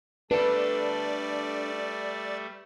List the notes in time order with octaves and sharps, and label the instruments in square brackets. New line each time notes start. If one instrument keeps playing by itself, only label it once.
[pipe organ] G3 A3 [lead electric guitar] D4 A4 [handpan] B4 [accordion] D5